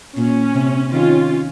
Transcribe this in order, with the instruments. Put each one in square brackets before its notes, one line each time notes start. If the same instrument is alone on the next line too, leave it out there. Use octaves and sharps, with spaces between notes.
[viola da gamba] A#2 [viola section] C#4
[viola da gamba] C3
[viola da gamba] D#3 [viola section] C#4 F4